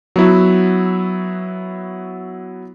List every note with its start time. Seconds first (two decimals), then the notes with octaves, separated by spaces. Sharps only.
0.16 F#3 B3 E4 F#4